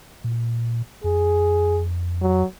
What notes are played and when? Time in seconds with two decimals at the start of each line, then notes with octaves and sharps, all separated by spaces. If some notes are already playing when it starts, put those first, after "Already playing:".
0.24 A#2
1.04 F2 G#4
2.21 F#3